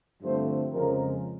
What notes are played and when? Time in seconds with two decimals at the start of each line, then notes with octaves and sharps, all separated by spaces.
0.22 G2 D3 F3 A3 C4 C5
0.73 F2 C#3 F3 G#3 A#4